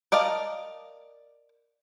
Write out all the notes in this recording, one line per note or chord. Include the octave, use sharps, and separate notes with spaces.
A#4 D5 D#5 F5 A5